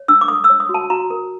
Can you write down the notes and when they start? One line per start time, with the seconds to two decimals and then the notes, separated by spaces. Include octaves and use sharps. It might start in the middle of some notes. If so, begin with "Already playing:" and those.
Already playing: C#5
0.08 D4 E6
0.21 D6
0.28 A4 D#6
0.44 E6
0.50 C#5
0.60 D#6
0.69 F#4
0.74 A5
0.90 F#4 A#5
1.10 A#4